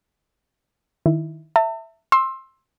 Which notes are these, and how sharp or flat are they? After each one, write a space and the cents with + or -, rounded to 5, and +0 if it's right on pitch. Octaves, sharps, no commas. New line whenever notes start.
D#3 +0 E4 +0
E5 +0 A5 +40
C6 +20 E6 +0